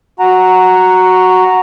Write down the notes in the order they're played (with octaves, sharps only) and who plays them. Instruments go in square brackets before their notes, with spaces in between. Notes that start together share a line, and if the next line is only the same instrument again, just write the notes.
[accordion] F#4 F#5 A#5